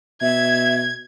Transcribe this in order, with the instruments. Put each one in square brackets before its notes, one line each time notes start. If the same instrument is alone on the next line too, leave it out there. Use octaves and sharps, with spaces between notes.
[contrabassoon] B2 [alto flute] E5 [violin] G#6